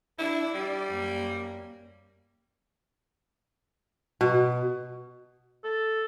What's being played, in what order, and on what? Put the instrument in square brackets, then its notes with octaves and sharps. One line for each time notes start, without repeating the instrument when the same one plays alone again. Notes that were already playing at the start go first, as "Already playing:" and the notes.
[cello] D4 [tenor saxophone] E4
[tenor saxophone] G3 [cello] D5
[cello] F#2 A#3
[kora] B2
[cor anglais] A4